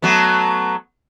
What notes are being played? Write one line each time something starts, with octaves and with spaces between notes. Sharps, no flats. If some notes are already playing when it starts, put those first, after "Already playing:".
F#3 A3 B3